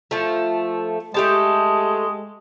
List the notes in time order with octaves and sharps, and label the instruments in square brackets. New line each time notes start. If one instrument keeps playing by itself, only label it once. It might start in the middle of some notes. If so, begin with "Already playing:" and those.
[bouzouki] F3 A3
[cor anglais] G#3 [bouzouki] A3 G4 A5